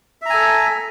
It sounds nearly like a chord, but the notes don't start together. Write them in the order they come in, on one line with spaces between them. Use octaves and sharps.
E5 A#5 G#5 A4